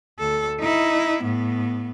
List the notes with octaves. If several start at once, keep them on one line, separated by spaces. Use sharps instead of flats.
D2 A4
D#4 E4
A2 B3